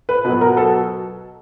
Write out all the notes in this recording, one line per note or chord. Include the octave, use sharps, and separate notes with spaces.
B4
B2 B4
F#3
A#4
A4